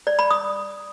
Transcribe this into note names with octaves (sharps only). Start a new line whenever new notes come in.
D5
B5
D#6